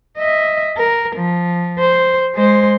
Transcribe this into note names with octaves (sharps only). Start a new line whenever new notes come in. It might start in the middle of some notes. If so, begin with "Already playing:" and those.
D#5 E5
A#4
F3
C5
G#3 C5